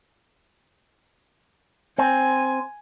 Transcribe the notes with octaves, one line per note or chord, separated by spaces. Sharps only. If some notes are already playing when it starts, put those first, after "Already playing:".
C4 G#5